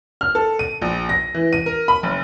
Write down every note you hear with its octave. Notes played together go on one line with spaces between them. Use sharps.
F6
A4
D#7
A#1
A#6
E3
D#7
A#4
B5
F#1